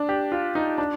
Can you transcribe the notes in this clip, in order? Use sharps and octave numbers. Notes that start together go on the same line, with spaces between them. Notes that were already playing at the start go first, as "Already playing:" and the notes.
Already playing: D4
G4
F4
D#4
D4